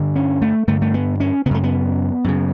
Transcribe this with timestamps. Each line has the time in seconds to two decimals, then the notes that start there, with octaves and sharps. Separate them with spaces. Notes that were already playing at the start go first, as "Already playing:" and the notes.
Already playing: G2 D3
0.16 C#4
0.42 A3
0.67 G2 D3 A3
0.82 A3
0.94 B3
1.20 C#4
1.46 C#3 B3
1.51 F#2 A3
1.63 B3
2.24 F#2 C#3